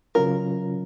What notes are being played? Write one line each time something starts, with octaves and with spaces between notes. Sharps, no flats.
C#3 F#3 C#4 F4 A#4